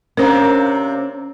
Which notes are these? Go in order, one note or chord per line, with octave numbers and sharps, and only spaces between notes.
C3 A#3 C#4 D4 A#4 C5